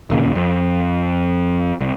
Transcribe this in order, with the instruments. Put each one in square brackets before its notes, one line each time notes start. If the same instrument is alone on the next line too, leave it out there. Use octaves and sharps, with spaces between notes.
[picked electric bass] D1 D#2 A#2 C#3
F2
C2